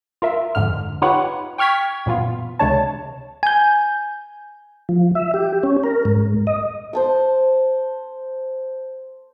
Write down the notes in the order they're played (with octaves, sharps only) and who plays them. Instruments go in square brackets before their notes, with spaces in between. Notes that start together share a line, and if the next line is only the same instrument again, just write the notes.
[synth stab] F4 A#4 E5
F2 G#2 D3 F6
D#4 F4 G4 B4 C#5 F#5
G5 C#6 F6 G#6 B6
F#2 A#2 E3 B3 F4
C#2 C3 G#3 D4 C#5 A5
[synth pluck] G#5 G6
[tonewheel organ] F3
E5
G4
C#4
A#4
G#2
D#5
[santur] C5 A5 D6